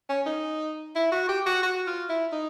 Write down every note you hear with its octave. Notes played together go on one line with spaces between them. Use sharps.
C#4
D#4
E4
F#4
G4
F#4
F#4
F4
E4
D#4